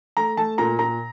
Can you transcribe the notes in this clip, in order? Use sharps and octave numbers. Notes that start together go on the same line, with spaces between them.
A3 A#5
A3 A5
A#2 A#5
A#2 A#5